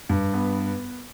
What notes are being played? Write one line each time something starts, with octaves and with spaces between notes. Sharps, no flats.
G2
B3